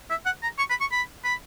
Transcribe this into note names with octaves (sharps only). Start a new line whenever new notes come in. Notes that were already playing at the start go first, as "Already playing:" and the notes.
E5
F#5
A#5
C#6
B5
C#6
B5
B5